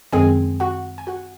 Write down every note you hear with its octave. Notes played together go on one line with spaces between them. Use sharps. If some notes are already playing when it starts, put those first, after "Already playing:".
F#2 D#3 G#3 C4 G#4 G#5
F#4 F#5
G#5
F#4 F#5